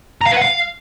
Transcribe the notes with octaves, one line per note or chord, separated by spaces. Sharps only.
A#5
F5
B4
F#5
F5